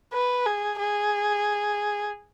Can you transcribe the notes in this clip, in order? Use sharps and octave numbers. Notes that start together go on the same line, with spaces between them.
B4
G#4
G#4